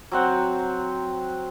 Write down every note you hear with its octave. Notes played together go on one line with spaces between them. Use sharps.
F#3 C4 F#5